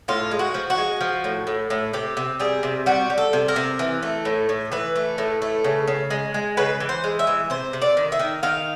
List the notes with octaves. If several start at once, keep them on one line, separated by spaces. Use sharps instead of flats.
A2 F4
G#3
F#4
F3
F#4
G#3
F3
A2
A2
A2
C3 G4
C3
G3 G#4
C3
G3 F#4
G3
A4
C3
A#4
C3
E3
A3
A2
A2
E3 B4
A3
A2
A3
C#3
C#3
G#3
G#3
C#3 B4
E3
C5
G#3
E5
E3
C3 C5
C3
D5
D#3
E5
D#3
D#3 F5